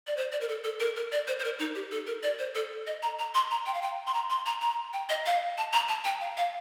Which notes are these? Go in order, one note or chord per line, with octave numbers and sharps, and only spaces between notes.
D5
C5
D5
A#4
A4
A4
A#4
A#4
D5
C5
C5
A#4
D#4
G4
A4
A#4
D5
C5
A4
D#5
A#5
A#5
C6
A#5
G5
F5
G5
C6
A#5
C6
A#5
A#5
G5
D#5
F5
A5
A#5
A5
G5
F5
F5